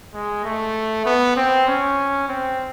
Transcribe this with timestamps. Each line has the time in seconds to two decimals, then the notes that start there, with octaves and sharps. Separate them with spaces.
0.14 G#3
0.44 A3
1.06 B3
1.36 C4
1.67 C#4
2.28 C4